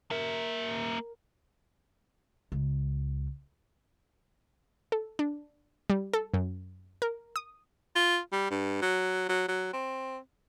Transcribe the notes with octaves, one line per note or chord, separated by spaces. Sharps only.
A#3 A#4 E5
C#2
A4
D4
G3
A4
F#2
A#4
D#6
F4
G3
G2
F#3
F#3
F#3
C4